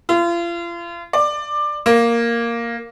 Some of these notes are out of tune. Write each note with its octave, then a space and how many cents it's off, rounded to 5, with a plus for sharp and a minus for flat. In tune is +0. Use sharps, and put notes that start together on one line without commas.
F4 -35
D5 +15
A#3 +0